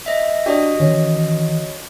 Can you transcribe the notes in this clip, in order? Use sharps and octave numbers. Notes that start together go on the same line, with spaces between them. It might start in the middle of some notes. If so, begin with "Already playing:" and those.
D#5 E5
D4 F#4 G4 D#5 D#6
D#3 E3 C#4